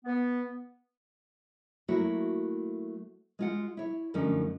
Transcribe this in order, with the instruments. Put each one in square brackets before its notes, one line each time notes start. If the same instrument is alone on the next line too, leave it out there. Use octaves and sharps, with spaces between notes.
[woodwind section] B3
[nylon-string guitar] F#3 A3 A#3 E4 F#4 C#5
G#3 F4 F#5
E4 C#5
F#2 D3 F3 A3 C#4 D#4